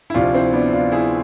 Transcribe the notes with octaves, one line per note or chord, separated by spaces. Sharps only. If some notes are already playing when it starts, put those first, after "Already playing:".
E4
D2 C3 F3 D4 F4
C4 E4
B3 D4
D4 F4
E4 G#4